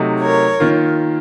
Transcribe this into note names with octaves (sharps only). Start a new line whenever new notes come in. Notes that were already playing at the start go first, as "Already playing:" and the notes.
Already playing: C3 F#3 A3 D#4
A#4 C#5
D#3 A#3 F4